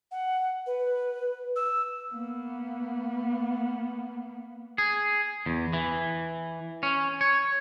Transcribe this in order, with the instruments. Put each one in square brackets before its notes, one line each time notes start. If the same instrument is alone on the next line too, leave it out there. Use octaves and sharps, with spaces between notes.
[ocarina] F#5
B4
E6
[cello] A#3 B3
[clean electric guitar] G#4
E2
E3
C#4
C#5